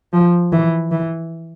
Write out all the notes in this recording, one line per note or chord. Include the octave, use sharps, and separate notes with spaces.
F3
E3
E3